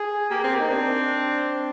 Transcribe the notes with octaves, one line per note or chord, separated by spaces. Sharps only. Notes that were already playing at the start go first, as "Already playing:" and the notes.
Already playing: G#4
A#3 G4 A#4
C4 G#4
G4
A#3 D#4
C4 D4